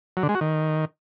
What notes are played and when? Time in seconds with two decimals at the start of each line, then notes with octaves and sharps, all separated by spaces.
0.17 F#3
0.23 D3
0.29 G#3
0.35 F#4
0.41 D#3